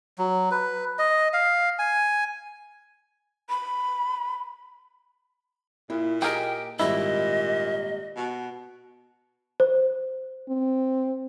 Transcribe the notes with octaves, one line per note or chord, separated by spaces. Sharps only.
F#3
B4
D#5
F5
G#5
B5
A#2 E4
G4 G#4 A#4 D#5 G5
G#1 A#2 G3 E4 D#5
B2
C5
C4